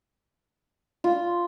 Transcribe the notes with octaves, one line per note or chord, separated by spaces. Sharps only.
F4